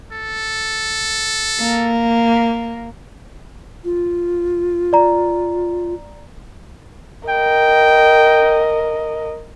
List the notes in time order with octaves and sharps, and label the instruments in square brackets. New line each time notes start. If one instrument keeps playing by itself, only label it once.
[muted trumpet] A4
[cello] A#3
[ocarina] F4
[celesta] D5 A#5
[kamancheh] A#4 D#5 [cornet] G5